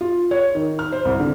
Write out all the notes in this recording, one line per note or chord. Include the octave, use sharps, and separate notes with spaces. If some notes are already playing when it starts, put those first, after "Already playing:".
F4
C#5
D#3
F6
C5
C2
D3